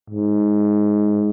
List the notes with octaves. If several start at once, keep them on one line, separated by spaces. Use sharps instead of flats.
G#2